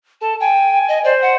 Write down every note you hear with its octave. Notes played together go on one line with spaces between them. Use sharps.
A4 A5
G5 G#5
D#5
C5 D5
F#5